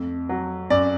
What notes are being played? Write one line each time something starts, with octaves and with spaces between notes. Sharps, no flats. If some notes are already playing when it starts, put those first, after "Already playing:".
Already playing: F2 A3
F#3
F#2 D5